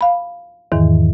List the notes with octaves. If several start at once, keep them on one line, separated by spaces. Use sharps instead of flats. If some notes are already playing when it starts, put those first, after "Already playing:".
F5 B5
E2 G#2 D#3 E3